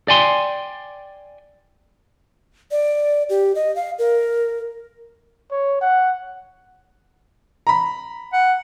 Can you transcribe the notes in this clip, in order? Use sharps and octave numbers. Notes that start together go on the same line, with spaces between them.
D5 G5 G#5 C6
D5
G4
D#5
F5
A#4
C#5
F#5
A#5 B5
F#5